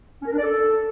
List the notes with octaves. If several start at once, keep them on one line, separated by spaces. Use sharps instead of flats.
C#4
A#4
D4
D5
A4